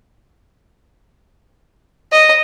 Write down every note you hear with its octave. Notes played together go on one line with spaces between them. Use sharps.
D#5